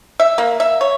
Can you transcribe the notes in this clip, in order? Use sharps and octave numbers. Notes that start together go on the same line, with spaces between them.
E5
A#3
E5
C#5